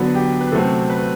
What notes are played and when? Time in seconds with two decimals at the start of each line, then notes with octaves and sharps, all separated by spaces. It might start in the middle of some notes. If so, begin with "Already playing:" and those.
Already playing: D3 F#3 B3 B4
0.15 G4
0.41 B4
0.52 C3 F#3 A3 C4 A4
0.90 B4